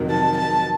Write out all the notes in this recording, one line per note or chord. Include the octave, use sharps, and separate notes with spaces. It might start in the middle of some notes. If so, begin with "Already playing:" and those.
Already playing: F2 C3 D#3 F#3
A5
A5